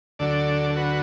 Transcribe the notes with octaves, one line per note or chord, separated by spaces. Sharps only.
D2 D3 F#3 A4 D5
A4
F#4 B4